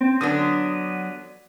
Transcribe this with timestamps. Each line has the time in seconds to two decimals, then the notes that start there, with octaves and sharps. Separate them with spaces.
0.01 C4
0.21 D3 F#3 B3 D4 D#6